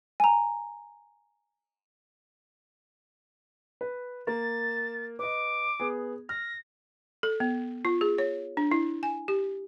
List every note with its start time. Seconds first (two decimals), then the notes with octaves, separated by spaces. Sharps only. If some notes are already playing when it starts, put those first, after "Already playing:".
0.20 G#5 A#5
3.81 B4
4.27 A#3 A6
5.19 B4 D#5 D6
5.80 B3 G#4
6.29 F6 A#6
7.23 A4
7.40 B3
7.85 F4
8.01 G#4
8.18 C#5
8.57 D4
8.71 E4
9.03 G#5
9.28 G4